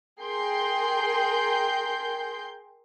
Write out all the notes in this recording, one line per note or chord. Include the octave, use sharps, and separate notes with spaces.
G#4 A#4 G5 C6 G6